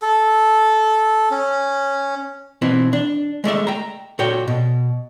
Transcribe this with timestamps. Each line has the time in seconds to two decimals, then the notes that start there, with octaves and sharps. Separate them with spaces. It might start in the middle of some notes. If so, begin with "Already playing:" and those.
0.02 A4
1.31 C#4
2.62 B2 E3 C4 E4
2.93 D4
3.44 G#3 A3 D5 E5
3.67 G5 A#5
4.19 A#2 F#4 A4 C#5 G5
4.48 B2